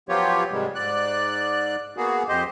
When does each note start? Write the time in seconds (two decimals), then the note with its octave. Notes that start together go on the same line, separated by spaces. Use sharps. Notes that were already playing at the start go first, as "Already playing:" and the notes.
0.09 F3 F#3 B3 F4 G4 C#5
0.52 G#2 C3 D#3 G3 G#3
0.75 G#2 D5 F#6
1.97 A#3 B3 F#4 G#4
2.29 F2 G4 C5 D#5